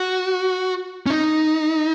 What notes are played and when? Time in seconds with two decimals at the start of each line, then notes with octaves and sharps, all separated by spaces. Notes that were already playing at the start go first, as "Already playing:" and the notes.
Already playing: F#4
1.06 C#4
1.10 D#4